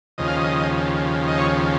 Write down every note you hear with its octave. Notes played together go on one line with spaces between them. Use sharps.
D#2 C#3 F3 D#5
F5
D#5
D#5
C#5